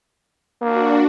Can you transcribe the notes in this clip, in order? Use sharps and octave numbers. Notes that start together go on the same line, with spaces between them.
A#3 D4 F#4